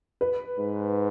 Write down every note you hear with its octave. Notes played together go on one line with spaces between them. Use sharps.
B4
G#2